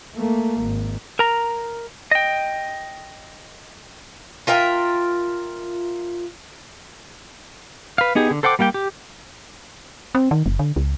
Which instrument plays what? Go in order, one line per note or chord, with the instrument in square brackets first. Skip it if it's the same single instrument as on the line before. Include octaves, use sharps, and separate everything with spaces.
[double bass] A3 A#3
G#1
[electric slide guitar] A#4 A#5
D#5 G5
[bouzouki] F4 A#4 E5 G5
[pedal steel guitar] B4 F5
B3 D#4 G4 G#4
D3
A4 C5 F#5 G5 D6
G3 A#3 G4 G5
G4
[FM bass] C4
D#3
F#1
D3
C#2